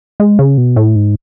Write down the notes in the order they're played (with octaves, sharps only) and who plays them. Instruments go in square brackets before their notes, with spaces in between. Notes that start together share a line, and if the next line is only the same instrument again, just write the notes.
[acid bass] G#3
C#3
B2
A2
G#2